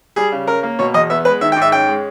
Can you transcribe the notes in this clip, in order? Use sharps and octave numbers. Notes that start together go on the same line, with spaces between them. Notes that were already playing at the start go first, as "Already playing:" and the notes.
G3 G#4
C#3
C#4 A#4
A#3
B2 C#5
E2 D#5
B3 E5
G#3 B4
D#3 E5
G5
G#2
E5
C#4 G5
G#3